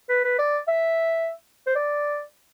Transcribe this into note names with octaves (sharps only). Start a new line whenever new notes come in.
B4
B4
D5
E5
C5
D5